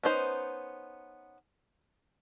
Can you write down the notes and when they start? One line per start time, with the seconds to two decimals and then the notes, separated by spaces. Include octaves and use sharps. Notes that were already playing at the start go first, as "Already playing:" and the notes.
0.04 B3 C#4 D#4 C5